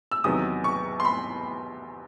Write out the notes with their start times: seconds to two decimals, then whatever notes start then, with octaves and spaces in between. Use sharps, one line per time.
0.11 E6
0.24 E2 C3 D#3 F#3 D#6
0.64 C#6
1.00 C6
1.05 B5